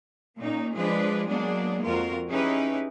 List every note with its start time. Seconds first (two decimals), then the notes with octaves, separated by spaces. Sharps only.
0.38 A#2 A#3 C#4 D#4
0.75 F3 G#3 D4 G#4 B4
1.28 F#3 G#3 A#3 B3 D4 G#4
1.85 F2 F4 F#4 A#4
2.30 C#4 D#4 E4 G4 G#4 B4